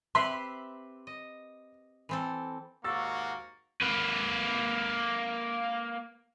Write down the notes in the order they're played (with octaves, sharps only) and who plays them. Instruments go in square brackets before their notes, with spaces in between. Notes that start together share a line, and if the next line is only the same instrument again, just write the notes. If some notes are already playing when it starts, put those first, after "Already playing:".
[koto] C4 G4 B4 [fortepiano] E5 B5 C6
[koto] D#5
E3 C4 A4
[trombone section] D#2 G#2 F#4 [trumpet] A#3 [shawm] C#6 [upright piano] E6 A6
[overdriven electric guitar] A#3 B4